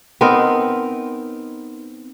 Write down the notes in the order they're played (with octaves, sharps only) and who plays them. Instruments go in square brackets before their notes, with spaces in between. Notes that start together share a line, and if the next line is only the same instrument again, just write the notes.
[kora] B3 C4 D#4 A#4